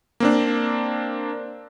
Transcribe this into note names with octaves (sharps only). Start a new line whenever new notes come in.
A#3 C4 D4